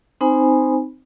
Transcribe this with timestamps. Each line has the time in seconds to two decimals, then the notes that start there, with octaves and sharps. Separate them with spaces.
0.21 C4 D#4 C5 G#5 B5